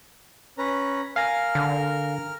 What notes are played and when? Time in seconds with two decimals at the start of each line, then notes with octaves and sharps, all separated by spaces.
0.58 C#4 B4 A#5
1.16 A#4 F5 G#5 F6 A#6
1.55 D3